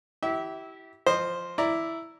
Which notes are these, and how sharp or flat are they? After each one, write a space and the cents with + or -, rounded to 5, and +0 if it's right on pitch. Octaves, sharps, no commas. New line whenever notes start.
E4 -15 G4 -30 E5 -20
F3 +0 C5 +0 D#5 -20
E4 +0 D5 +0 A#5 +0